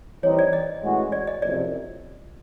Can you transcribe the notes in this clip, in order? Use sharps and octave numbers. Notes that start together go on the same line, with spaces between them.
E3 G3 C4 D#4 C#5
D5
D#5
A2 E3 G#3 C#4 F#4
D5
D#5
F#1 F2 C3 D5